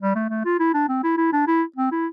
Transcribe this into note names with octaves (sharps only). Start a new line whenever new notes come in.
G3
A3
A3
F4
E4
D4
C4
E4
E4
D4
E4
C4
E4